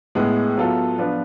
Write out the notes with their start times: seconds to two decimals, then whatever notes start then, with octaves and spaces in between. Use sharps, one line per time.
0.15 A2 G#3 B3
0.57 F#3 B3 F4 A4
0.98 F3 B3 D4 F4 B4